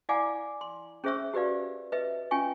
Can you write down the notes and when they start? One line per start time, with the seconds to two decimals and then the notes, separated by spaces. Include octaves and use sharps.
0.09 E4 D5 F5 F#5 G#5 D6
0.61 C6
1.04 C#4 G#4 C5 E5 C#6 E6
1.34 F#4 G4 B4 D5 F5
1.92 B4 D#5 E5
2.31 C#4 F4 G5 G#5 C#6